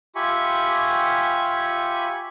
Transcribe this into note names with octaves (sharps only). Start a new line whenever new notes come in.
F4 G4 E5 G#5 B5 C#6